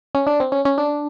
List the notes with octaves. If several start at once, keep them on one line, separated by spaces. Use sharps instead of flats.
C#4
D4
C4
C#4
C#4
D4